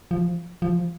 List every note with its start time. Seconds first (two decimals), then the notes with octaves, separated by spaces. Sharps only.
0.11 F3
0.62 F3